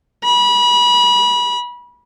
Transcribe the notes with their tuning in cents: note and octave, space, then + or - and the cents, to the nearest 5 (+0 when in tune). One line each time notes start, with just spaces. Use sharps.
B5 -30